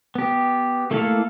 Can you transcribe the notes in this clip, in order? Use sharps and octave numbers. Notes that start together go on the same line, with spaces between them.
B3 G4
A3 A#3 E4 A4 F5